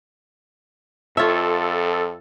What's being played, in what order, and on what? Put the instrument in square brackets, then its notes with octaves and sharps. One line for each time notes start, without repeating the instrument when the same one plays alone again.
[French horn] F2 [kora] F4 C#5 E5 [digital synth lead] A4